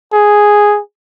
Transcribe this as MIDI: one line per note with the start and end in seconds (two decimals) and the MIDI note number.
0.13 0.81 68